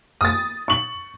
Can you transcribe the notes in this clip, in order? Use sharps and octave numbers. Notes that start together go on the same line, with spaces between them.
D#6 A6
C#6 F#7